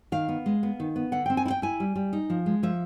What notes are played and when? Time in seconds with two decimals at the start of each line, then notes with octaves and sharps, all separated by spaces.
0.12 D#3 F5
0.28 B3
0.46 G#3
0.63 B3
0.80 D#3
0.96 B3
1.12 D3 F#5
1.26 C4 G5
1.37 G#5
1.45 E4
1.50 G5
1.62 E4 G#5
1.80 G3
1.96 G3
2.13 D#4
2.30 F3
2.46 G#3
2.63 F3 E5